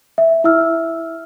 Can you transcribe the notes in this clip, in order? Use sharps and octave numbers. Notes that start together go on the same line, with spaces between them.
E5
E4 E5 E6 F6